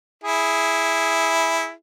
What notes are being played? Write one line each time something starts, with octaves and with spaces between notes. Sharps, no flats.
E4 G#4